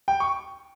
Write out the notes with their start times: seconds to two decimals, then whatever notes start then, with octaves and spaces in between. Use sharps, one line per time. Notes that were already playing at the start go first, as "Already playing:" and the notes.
0.08 G5
0.20 C#6